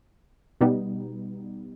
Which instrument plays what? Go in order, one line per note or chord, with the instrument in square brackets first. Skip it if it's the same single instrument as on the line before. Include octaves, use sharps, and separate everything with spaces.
[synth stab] B2 G3 B3 D#4